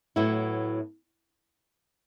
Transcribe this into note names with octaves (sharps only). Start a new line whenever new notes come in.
A2 F#3 B3 E4